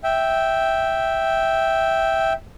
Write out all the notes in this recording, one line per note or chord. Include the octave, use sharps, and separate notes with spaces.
E5 G5